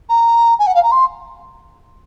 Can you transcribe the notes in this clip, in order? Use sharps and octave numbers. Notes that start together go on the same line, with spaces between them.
A#5
G#5
F#5
F5
A#5
C6